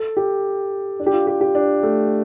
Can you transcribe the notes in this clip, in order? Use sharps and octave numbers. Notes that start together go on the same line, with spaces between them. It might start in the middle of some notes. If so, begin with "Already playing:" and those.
Already playing: A4
G4
D4
G4
F4
G4
G4
D4
A3